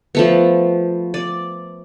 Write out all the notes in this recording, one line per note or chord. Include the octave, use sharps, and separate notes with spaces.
F3 A3 B3
D5